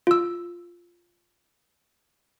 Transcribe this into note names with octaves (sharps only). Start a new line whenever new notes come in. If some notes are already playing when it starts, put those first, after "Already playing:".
F4 E6